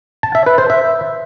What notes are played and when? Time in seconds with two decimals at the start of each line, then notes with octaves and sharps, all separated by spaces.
0.23 A5
0.35 E5
0.46 B4
0.58 C5
0.70 E5